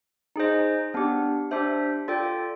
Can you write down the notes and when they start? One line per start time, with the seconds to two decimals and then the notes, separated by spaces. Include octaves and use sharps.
0.36 D#4 G#4 C5 D#5
0.94 B3 D4 G4
1.51 D4 G4 C5 E5
2.08 F4 A4 D5 G5